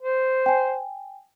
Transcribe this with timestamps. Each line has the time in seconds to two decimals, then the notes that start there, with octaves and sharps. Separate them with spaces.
0.01 C5
0.46 G5 G#5